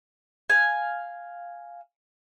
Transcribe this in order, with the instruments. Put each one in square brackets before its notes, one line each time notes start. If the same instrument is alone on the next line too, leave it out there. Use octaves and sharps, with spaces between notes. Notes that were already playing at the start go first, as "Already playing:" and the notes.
[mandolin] F5 G#5